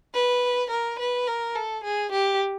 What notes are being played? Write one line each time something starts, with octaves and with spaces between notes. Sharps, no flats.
B4
A#4
B4
A#4
A4
G#4
G4